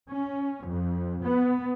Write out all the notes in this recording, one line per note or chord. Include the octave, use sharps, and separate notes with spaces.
C#4
F2
B3